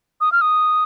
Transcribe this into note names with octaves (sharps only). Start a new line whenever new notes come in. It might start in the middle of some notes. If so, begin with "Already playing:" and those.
D#6
F6
D#6